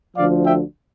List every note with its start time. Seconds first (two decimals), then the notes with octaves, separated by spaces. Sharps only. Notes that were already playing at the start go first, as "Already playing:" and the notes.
0.16 D2 D3 F3 D5 F5
0.45 E5 G5